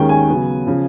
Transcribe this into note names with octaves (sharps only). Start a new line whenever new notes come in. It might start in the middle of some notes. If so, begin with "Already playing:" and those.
Already playing: D#2 D#3 G#3 C#4 G5
G#5
C#3 F#3 B3
C#3 F3